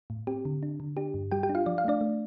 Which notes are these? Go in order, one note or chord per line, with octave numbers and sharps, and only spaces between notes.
A2
C4 G4
D3
D4
D3
D4 G4
G2
G3 G4 G5
G4 G5
D4
F4 F5
F3 D5
F5
A3 D4 D5
A3